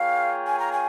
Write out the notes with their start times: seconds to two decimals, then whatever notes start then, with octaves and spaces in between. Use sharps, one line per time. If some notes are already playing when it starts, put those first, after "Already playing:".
Already playing: A#3 F4 G#4 C#5 F5 G5
0.47 G#5
0.59 A#5
0.73 G#5